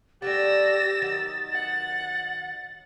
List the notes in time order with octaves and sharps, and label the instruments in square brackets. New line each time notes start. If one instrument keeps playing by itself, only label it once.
[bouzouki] G3 A3 F#4 [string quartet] G4 E6 A#6 [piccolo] A6
[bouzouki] D#3 F#3 D#5
[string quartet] F#5